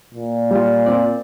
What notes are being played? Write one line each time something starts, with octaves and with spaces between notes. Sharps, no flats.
A#2
G3 F4
C4 D5